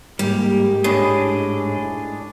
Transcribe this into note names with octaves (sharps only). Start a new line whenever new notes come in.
G#2 G3 A#3 G4
A2 D4 G#4 D#5